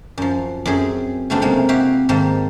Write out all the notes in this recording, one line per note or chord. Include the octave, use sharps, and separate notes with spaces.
F#2 F3
F#2 C4 G#4
C#3 F#3 A3 B3 C4 D4
C3 G#3 A#3
E4 F#4 G4 E5 F5
G#2 D#3 A#3 C4 A5